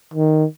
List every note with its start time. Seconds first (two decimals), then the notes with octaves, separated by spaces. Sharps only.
0.14 D#3